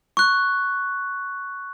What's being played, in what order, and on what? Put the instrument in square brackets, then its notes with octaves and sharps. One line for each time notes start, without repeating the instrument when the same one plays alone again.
[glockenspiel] C#6 F#6